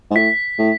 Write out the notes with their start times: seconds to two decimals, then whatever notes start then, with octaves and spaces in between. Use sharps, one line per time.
0.11 G#2
0.16 A2 B6
0.58 A2